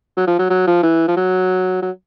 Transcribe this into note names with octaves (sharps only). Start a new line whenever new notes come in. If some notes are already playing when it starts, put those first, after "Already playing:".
F#3
F3
F#3
F#3
F3
E3
F3
F#3
F#3